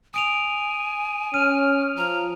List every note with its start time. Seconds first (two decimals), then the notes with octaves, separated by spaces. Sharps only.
0.14 G#5 D#6 D7 F7
1.34 C#4 F6 D#7
1.97 F3 A#5